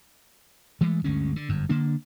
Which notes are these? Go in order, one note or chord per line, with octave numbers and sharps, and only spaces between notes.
E3 G#3 A3
G1 D2 G#3 C#4
D3
G1 F#2
D3 A#3 D4